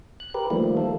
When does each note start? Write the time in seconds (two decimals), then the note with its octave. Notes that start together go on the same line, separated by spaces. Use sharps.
0.20 F#6
0.34 G4 A#4 B4
0.50 D#3 F3 G3 A3 A#3
0.77 A4